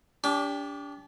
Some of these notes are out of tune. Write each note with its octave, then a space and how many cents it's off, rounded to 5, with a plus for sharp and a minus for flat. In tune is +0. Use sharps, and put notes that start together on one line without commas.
D4 -35 G4 +20